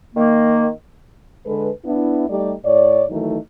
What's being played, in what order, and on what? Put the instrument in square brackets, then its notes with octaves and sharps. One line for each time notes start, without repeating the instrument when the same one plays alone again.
[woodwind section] D#3 A#3
[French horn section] D3 G#3 A4 B4
B3 D4 E4
G3 A3 D#4 G4 D5
A2 C#5 D5
D#3 E3 F#3 A3 D#4